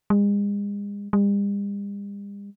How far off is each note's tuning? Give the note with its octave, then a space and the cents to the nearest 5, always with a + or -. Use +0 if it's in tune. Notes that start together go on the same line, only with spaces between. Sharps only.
G#3 -40
G3 +45